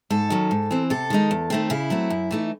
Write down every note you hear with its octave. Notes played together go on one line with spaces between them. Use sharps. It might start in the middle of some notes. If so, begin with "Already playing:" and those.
G#2 A4
D#3 F#3 C#4
G#2
E3 C4
C3 A4
D#3 G#3 D#4
E2
D#3 A3 C4
C#3 E4
F#3 A3 C4
F#2
E3 A3 D#4